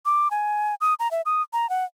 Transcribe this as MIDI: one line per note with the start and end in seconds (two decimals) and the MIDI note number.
0.06 0.31 86
0.31 0.75 80
0.81 0.94 87
1.00 1.11 82
1.11 1.22 76
1.26 1.42 87
1.53 1.69 82
1.70 1.85 78